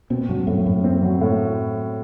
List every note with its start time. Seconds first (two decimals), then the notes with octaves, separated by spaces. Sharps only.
0.10 B2 C4
0.29 G2 F#3
0.47 F#2 A2
0.66 F#2 A2
0.84 C4
1.03 F#3
1.21 A2